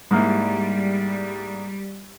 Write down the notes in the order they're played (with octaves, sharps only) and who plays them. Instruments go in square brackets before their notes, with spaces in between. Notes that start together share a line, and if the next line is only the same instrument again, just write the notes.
[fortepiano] G#2 A#3 E4 [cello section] G3